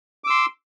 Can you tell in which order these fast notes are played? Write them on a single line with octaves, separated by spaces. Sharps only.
D6 E6 C6